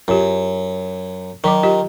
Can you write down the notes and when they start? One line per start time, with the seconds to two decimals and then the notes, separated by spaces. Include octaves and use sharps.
0.08 F#2 F4 G4
1.44 D#3 F#3 D#5 D6
1.63 F4 G4 D#5